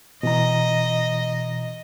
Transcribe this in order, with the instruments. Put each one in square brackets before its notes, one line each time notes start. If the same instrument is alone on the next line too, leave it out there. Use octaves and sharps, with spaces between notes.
[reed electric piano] B2 E3 A#5 [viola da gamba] D#5